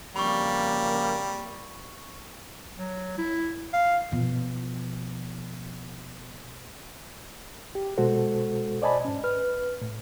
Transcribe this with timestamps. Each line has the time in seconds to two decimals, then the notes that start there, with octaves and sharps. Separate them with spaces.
0.16 F2 C#3 G3 A#3 B5 C#6
2.78 F#3
3.18 E4
3.73 F5
4.12 B2 F3
7.75 G4
7.98 B2 G#3 F#4 A4 C5
8.82 C5 D5 D#5 G#5 A5 B5
9.05 G#2 C#4
9.24 B4 F6
9.81 A2